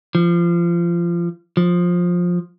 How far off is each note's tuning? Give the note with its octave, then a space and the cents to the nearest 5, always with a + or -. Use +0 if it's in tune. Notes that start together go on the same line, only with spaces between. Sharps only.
F3 -25
F3 +15